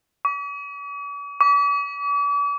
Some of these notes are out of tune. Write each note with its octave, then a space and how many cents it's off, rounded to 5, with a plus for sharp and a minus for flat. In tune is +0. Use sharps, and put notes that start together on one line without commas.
D6 -45
D6 -40